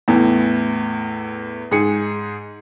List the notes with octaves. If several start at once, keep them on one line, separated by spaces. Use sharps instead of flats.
E2 A2
G#2 G#4 C#7